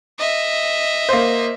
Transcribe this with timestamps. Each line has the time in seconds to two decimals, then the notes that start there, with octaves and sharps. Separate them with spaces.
0.19 D#5 E5
1.09 A#3 C5